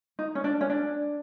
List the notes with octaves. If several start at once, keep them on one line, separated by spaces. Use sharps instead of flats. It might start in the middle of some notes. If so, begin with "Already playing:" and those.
D#4
C#4
D4
C#4
D4